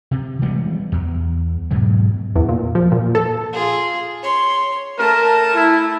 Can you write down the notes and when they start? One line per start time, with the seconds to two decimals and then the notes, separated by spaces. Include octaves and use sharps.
0.11 C3
0.42 E3 G3 G#3 B3
0.92 E2
1.71 G#2 B2 F#3
2.36 E2
2.49 A#2
2.75 F3
2.92 A#2
3.15 A4
3.53 F4 G#4
4.23 C#5 C6
4.98 A3 A#4 A5
5.55 E4